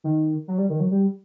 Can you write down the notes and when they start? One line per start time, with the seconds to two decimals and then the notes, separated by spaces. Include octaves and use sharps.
0.04 D#3
0.48 F#3
0.58 G3
0.69 D#3
0.80 F#3
0.91 G3